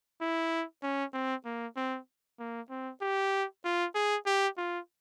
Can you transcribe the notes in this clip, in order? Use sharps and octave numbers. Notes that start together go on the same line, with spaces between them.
E4
C#4
C4
A#3
C4
A#3
C4
G4
F4
G#4
G4
F4